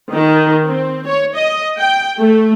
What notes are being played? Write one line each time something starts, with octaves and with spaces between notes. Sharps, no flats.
D#3
C4
C#5
D#5
G5
A3